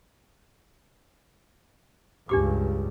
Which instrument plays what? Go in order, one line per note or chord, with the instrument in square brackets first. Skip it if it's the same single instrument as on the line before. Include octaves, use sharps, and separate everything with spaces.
[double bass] C#2 G2 [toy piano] D4 G4 D6